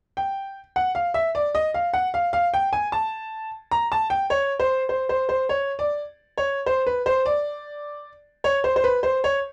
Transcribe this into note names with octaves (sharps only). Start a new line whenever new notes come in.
G5
F#5
F5
E5
D5
D#5
F5
F#5
F5
F5
G5
G#5
A5
A#5
A5
G5
C#5
C5
C5
C5
C5
C#5
D5
C#5
C5
B4
C5
D5
C#5
C5
C5
B4
C5
C#5